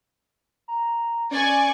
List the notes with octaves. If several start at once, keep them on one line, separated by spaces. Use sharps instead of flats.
A#5
C#4 D5 G#5 C#6